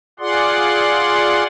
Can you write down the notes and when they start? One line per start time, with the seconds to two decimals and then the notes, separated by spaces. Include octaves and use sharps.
0.20 F4 G#4 D5 F#5 C6